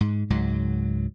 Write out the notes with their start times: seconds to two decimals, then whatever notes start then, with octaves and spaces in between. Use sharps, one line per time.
0.01 G#2
0.30 C#2 G#2 F#3